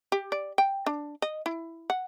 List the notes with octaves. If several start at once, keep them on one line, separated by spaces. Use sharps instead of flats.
G4
D5
G5
D4
D#5
E4
F#5